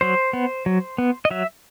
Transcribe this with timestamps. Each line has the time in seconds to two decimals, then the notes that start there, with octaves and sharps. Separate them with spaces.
0.01 F#3 C5
0.33 B3
0.66 F#3
0.98 B3
1.25 D#5
1.31 F#3 E5